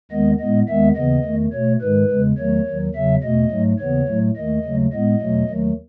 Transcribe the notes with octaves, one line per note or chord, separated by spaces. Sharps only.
D#2 D#3 G#3 B3 D#5
A2 G#3 B3 D#5
D#2 D#3 G#3 B3 E5
D#2 C#3 E3 B3 D#5
E2 D#3 A3
B2 A3 C#5
G#2 D#3 G#3 B4
E2 C#3 G#3
E2 D#3 F#3 A3 C#5
D#2 D#3 F#3
E2 C#3 F#3 E5
E2 B2 A3 D#5
G#2 F#3 A3
D#2 C#3 E3 B3 C#5
A2 F#3 A3
D#2 D#3 A3 D#5
D#2 C#3 F#3 A3
A2 G#3 B3 D#5
E2 B2 F#3 A3
D#2 D#3 F#3 A3